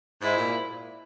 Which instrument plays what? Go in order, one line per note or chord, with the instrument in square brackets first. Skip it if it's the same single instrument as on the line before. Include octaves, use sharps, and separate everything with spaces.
[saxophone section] G#2 [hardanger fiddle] E4
[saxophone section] A#2